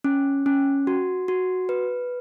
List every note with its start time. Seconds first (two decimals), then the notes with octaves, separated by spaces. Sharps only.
0.04 C#4
0.46 C#4
0.87 F#4
1.28 F#4
1.69 B4